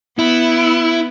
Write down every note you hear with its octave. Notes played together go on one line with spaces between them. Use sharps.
B3 E4